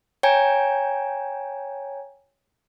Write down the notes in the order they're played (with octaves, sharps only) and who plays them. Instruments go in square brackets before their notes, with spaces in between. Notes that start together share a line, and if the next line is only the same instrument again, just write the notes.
[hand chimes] C#5 G5 G#5 A#5 G#6